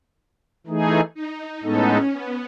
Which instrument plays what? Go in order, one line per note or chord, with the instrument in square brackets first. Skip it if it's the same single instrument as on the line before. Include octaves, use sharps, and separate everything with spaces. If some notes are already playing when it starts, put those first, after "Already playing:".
[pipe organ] E3 A3 D#4 G#4
[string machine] D#4
[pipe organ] A2 G#3 B3 D#4 A4 [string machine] C#4
[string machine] B3